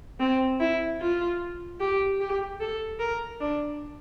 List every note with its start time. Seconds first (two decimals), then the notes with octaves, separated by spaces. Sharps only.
0.20 C4
0.60 E4
1.01 F4
1.80 G4
2.21 G4
2.60 A4
3.00 A#4
3.41 D4